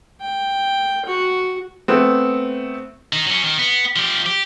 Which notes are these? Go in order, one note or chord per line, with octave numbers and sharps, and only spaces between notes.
G5
F#4
A3 B3 C4
D#3 D#4
F#3 C#4
D#3
B3
F3 G4
G4